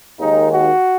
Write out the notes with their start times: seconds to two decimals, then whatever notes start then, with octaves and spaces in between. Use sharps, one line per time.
0.19 D#2 D#3 G#3 D#4
0.51 F#4